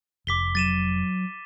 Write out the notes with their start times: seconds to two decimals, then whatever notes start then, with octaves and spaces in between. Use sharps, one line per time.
0.27 F1 D6 B6 G7
0.55 F#3 A6 D#7 E7